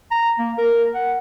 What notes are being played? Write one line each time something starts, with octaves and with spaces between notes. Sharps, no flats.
A#5
A#3
A#4
F#5